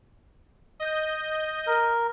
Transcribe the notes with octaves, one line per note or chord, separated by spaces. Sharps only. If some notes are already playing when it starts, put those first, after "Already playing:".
D#5 G6
A#4